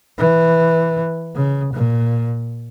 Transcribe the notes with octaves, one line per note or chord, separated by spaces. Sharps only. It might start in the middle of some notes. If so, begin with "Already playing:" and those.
E3
C#3
A#2